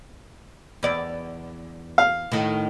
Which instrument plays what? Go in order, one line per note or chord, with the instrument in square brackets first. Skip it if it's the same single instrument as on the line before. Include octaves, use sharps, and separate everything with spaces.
[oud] E2 D5
[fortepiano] F5
[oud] A2 D#3